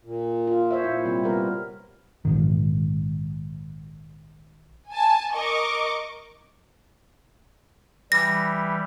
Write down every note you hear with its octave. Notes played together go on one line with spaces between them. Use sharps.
A#2
F4
C5 C#5 E5
A#2 E4
C3 G3 C4
G3 B3 A#4
A#1 G#2 D#3
G#5 A5
A#4 D#5 C#6 D6
E3 G3 A#6